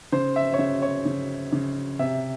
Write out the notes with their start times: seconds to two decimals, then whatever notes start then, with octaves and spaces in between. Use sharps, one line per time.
0.12 C#3 C5
0.36 E5
0.54 C#5
0.58 C#3 E5
0.82 C#5
1.05 C#3
1.53 C#3
1.99 C3 E5